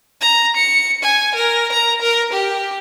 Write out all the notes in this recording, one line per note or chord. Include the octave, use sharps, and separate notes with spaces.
A#5
C#7
G#5
A#4
A#5
A#4
G4